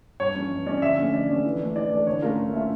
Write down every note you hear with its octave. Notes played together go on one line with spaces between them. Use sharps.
G2 C#5
F3 C#4
G2
F3 C#4 D5
D3 E5
F3 A3 C#4
D3 D5
F3 A3 C#4
E3
A3 D4
E3 D5
A3 D4
D3 C#5
A3 C#4 F4 A#4
D3
A3 C#4 F4 E5